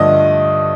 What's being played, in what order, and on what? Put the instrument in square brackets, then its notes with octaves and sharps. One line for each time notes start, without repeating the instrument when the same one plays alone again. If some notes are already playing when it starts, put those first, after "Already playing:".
Already playing: [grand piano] G2 D3 F3 A3 D5 D#5 D#6